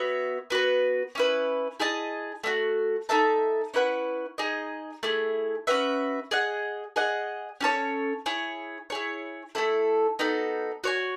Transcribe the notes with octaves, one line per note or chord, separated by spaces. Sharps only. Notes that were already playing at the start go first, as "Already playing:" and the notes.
Already playing: B3 F#4 C#5 E5
B3 F#4 B4
C#4 E4 B4
E4 G#4 D#5 A5
A3 D#4 F#4
D#4 A4 E5 A5
C#4 E4 B4 F#5
D#4 G#4 D#5
A3 E4 G#4
C#4 F#4 B4 E5
G#4 D#5 F#5
G#4 D#5 F#5
C#4 F#4 A4 C#5
E4 G#4 C#5
E4 G#4 C#5
A3 C#4 E4 A4
B3 D#4 F#4 A4
F#4 C#5 G#5